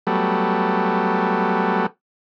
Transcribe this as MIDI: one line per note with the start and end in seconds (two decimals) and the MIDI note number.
0.07 1.86 54
0.07 1.86 55
0.07 1.86 57
0.07 1.86 59